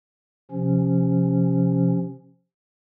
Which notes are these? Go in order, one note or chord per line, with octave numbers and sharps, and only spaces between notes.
C3 F3 C#4